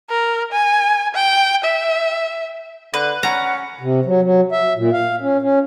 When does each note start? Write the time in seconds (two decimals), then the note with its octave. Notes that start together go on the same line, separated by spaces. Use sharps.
0.10 A#4
0.52 G#5
1.15 G5
1.64 E5
2.94 D3 B4
3.23 C#4 F#5 A#5
3.80 C3
4.05 F#3
4.22 F#3
4.52 E5
4.76 A#2
4.93 F5
5.21 C#4
5.42 C#4